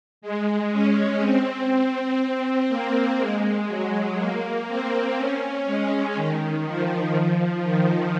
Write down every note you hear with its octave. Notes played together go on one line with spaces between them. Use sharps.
G#3
C#4
C4
A#3
G#3
F#3
A#3
C4
C#4
G#3
D#3
F3
F3
D#3